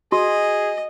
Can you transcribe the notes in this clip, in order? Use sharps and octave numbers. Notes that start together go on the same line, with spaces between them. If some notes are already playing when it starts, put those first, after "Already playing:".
F#4 G#4 D#5